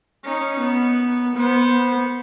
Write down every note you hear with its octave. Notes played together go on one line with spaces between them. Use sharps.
C#4 D#4
B3
B3 C5